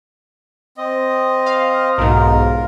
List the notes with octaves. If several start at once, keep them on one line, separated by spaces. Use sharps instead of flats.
C4 D#5
F5
B1 G#2 F4 A#4